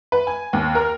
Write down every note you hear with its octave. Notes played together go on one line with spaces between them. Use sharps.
B4
G#5
D#2
A#4